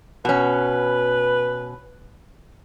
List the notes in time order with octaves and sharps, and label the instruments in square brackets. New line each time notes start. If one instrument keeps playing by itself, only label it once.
[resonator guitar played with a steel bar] B2 C#4 [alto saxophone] B4